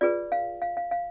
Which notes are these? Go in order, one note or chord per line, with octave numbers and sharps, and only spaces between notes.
F4 G#4 B4 D5
F5
F5
F5
F5